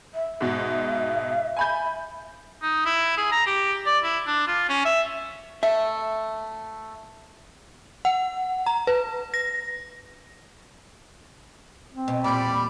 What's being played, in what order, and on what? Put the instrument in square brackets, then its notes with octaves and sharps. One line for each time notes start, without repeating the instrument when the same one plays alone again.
[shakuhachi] E5
[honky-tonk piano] G#2 B2
G#5 B5 G6
[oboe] D#4
E4
G#4
A#5
G4
D5
E4
D4
F4
C#4
E5
[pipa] A3 [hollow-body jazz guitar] E5
[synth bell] F#5
A#5
B4
A#6
[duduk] C4
[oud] B2
[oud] E2 A#2 [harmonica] G3 D5 B5